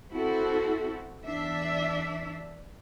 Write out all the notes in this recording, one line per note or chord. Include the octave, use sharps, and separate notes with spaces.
C4 E4 F#4 A4
E2 D4 E5